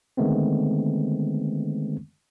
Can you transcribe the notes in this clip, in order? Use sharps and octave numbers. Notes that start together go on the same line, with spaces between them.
D3 D#3 G#3 A3 B3 C4